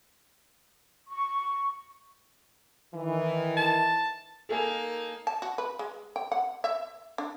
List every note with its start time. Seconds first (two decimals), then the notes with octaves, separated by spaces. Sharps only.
1.09 C#6
2.94 D#3 E3
3.57 A5
4.49 A#3 D#4 A4 A#4 G#5
5.27 A5
5.42 F#4
5.58 B4
5.79 G#3
6.16 G5
6.32 F#5
6.64 E5
7.18 D4